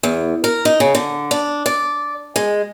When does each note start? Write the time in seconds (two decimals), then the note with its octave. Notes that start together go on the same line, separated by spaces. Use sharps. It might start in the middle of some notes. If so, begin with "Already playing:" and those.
0.03 E2
0.44 A#4
0.65 D#4
0.80 C#3
0.95 D3
1.31 D4
1.66 D5
2.36 G#3